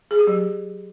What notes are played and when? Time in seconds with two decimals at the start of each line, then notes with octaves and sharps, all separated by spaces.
0.11 G#4
0.19 G4
0.27 F#3